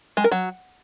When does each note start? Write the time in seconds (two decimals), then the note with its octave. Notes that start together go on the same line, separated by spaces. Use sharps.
0.17 G#3
0.24 A#4
0.32 F#3